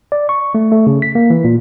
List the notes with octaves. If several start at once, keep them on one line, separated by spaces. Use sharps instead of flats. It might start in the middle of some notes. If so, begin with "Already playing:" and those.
D5
C#6
A3
A3
C#3
B6
A#3
E3
A#2